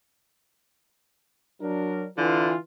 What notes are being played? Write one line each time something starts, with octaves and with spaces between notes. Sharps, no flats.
F#3 D4 A#4
D3 E3 F4